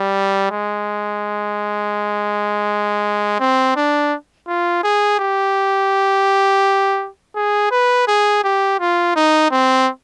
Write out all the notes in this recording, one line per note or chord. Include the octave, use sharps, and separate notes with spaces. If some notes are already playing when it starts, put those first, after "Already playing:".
Already playing: G3
G#3
C4
D4
F4
G#4
G4
G#4
B4
G#4
G4
F4
D#4
C4